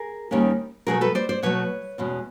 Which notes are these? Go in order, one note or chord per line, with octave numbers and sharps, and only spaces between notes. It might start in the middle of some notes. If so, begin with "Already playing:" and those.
Already playing: G#4 A#4
D#2 D#3 G3 A#3 C#4
B2 F#3 A3 G#4 A#4
A4 B4
C5 D5
C5 D5
B2 F#3 A3 B4 C#5
E2 B2 G#3 C#4